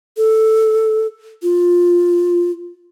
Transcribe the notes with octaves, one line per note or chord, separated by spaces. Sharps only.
A4
F4